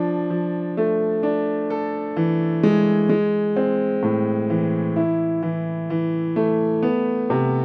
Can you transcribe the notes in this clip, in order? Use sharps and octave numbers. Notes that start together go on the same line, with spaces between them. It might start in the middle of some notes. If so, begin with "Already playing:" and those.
Already playing: F3 D4
F3
A3
D4
A4
E3
G#3
G#3
C4
A2
E3
E4
E3
E3
A3
B3
C3